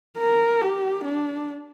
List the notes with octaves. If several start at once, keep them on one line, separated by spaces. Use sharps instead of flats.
A#4
G4
D4